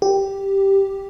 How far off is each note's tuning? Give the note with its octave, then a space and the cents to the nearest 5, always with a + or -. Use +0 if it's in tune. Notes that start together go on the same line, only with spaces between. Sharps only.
G4 +0